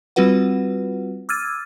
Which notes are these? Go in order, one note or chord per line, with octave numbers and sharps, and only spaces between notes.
G3 C4 F4 F#4 B4 F#5
D6 E6 F6 G#6 A6 D#7